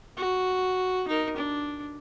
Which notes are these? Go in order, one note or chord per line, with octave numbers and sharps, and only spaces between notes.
F#4
D#4 A#4
D4